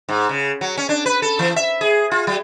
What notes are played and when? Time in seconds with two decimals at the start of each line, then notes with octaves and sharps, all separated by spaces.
0.09 G#2
0.29 C#3
0.61 F#3
0.77 C#4
0.89 D4
1.06 B4
1.22 A4
1.39 E3
1.56 E5
1.81 G#4
2.11 F4
2.27 F#3